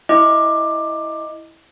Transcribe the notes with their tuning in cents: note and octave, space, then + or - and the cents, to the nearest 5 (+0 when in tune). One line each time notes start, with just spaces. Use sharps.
E4 -5 D#5 +0 D6 +15